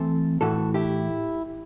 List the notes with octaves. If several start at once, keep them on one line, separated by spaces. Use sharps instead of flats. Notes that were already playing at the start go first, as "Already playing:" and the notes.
Already playing: E3 A3 C4 A4 C5
A2 E3 A3 F#4 A4
E4 G4